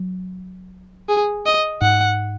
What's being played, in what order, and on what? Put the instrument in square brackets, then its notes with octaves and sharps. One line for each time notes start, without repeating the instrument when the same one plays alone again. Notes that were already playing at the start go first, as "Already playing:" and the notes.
Already playing: [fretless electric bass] F#3
[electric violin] G#4
D#5
[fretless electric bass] G#2 [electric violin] F#5